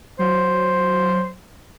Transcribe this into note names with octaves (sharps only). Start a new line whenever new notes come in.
F#3 C5